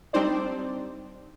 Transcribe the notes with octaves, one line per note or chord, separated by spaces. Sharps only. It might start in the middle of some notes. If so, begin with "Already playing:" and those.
G3 C4 D4 D#4 C5 D5